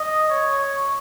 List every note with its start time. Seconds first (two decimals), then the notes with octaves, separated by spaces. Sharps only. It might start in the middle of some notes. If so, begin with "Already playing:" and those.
Already playing: D#5
0.30 C#5